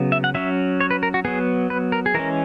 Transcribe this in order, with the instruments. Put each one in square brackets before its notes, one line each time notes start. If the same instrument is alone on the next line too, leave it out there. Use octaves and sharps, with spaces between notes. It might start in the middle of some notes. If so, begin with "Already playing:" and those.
Already playing: [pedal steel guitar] C#3 F#3 B3
E5
F#5
F#3 C#4 E5
C#5
B4
A#4
F#4
F#3 B3 G#4
B4
A#4
G#4
E3 G#3 C#4 A#4